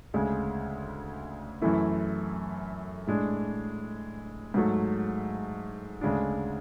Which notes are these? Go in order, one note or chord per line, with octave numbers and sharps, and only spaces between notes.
D2 C#3 G#3
F#2 E3 A3 E4
A2 G#3 D4
G#2 F#3 A3
D2 C#3 G#3 D4